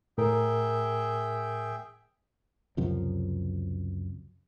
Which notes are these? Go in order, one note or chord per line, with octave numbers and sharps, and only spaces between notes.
A2 G#4 A#4 E5 G5
C#2 F#2 C3 F3